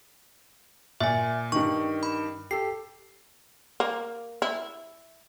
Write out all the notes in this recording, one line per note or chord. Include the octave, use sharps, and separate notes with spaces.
A#2 E5 G#5
G2 D#3 C#6
B5
G4 A4 C7
A#3
E4